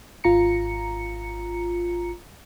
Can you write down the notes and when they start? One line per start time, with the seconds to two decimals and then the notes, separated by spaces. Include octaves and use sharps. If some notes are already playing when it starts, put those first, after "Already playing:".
0.24 G#1 F4 A#5 C#7